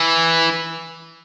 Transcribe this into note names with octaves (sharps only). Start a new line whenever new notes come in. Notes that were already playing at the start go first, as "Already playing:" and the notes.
Already playing: E3